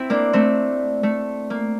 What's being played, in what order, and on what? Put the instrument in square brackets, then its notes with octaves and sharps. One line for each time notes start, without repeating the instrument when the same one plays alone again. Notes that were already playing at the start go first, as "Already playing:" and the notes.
Already playing: [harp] C4 E4
A#3 D4
A3 C4
A3
A#3